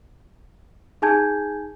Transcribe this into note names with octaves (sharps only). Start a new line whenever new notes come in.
D#4 G#4 G#5 A5 G6 G#6